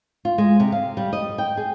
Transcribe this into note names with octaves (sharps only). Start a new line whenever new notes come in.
F4
G#3
C3
F5
G3
D#5
G5
G#4